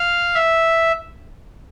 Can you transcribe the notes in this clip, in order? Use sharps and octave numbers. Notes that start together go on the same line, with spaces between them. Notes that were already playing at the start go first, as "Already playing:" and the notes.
Already playing: F5
E5